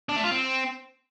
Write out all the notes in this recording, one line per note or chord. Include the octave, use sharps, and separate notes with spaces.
D4
A3
F4
C4